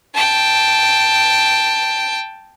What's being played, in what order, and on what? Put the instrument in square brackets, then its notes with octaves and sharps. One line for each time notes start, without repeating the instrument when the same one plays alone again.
[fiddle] G5 A5